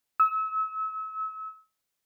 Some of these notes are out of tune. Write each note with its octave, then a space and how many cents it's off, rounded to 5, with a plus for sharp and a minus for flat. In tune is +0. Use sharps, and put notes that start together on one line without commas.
E6 -35